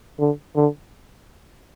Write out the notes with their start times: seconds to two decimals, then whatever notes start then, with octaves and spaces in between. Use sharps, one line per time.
0.20 D3
0.56 D3